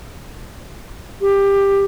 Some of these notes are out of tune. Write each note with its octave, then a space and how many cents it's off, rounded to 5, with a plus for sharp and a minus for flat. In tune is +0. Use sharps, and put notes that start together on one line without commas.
G4 +15